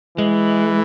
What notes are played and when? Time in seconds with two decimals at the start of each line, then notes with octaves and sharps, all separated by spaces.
0.18 E3 G#3